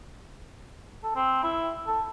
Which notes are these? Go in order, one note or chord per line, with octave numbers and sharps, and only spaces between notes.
A4
C4
E4
A4